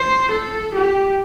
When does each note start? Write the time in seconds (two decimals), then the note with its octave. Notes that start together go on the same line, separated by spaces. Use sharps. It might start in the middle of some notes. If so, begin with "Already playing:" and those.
Already playing: C5
0.32 A4
0.74 G4